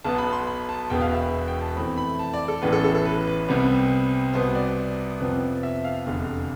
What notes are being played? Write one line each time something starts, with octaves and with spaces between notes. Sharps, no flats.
B1 B2 B3 A5
B5
C6
B5
A5
E1 E2 B2 B3 G5
F5
E5
B5
G5
A5
F2 E3 A3 C4 B5
B5
A5
D5
A4
A1 A2 E3 B3 B4
A4
A4
A4
B4
B4
C2 C3 G3 B3
C2 B2 B3 C5
D5
F2 C3 F3 B3
E5
F5
F1 E2 D3